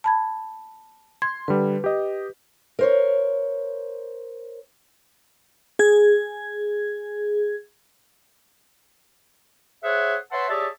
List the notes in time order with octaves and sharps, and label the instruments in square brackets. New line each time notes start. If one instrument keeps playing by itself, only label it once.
[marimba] A5 B5 G#6
[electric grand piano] C6 [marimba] G#6
[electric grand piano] D3 G3 [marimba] B4
[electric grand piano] G4 D#5
[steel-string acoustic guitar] A#4 C5 C#5
[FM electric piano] G#4 G#6
[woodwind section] G#4 C5 C#5 E5 F#5
B4 C#5 E5 F#5 A5 C6
G4 G#4 C#5 D5 E5 A5